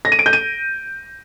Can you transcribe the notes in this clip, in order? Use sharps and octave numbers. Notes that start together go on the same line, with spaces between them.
A#6
D#7
D7
G6
D#7